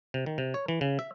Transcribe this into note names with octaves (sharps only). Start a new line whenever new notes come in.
C3
D#3
C3
C#5
E3
C#3
E5